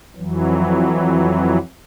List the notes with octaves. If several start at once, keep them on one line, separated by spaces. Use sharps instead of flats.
F2 E3 F#3